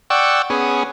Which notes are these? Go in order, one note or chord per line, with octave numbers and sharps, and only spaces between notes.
D5 F#5 G5 C#6 E6
B3 C#4 G#4